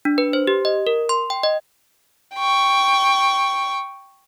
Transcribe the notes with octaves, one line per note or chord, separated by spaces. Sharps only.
D4
B4
C5
G4
D#5
A#4
C6
G5
D#5
G5 C#6